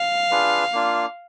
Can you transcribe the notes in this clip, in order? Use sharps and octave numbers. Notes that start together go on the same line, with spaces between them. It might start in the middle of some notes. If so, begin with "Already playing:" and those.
Already playing: F5
D4 F4 G#4 B4
A#3 D4 F4